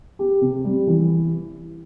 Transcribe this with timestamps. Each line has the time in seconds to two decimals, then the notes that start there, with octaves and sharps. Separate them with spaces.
0.19 G4
0.41 C3
0.65 G3
0.87 E3